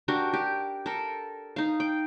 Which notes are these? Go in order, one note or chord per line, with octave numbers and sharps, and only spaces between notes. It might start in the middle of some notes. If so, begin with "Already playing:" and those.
D4 F#4 G4 A#4
G4
A4 A#4
D#4 F5
G5